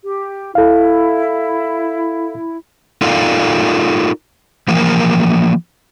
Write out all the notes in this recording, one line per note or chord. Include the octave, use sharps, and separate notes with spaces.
G4
E4 A4 F5
D#4 F4 A4 A#4 D5 F5
E3 F3 A#3 A#4